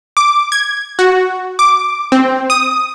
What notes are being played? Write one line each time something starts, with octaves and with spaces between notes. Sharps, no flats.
D6
G#6
F#4
D6
C4
D#6